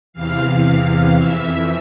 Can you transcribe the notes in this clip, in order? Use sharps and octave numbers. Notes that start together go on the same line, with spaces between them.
E2 C3 E3 F5
F2 E3 E5